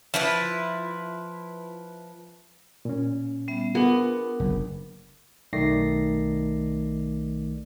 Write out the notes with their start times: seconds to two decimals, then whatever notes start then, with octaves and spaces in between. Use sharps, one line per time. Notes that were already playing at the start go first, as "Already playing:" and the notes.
0.14 F3 E4 B4
2.85 A#2 C#4
3.48 G3 B3 E5
3.75 B3 D4 F4 G#4 A#4
4.40 F#1
5.53 B1 D#3 A3 D5 A#6 C7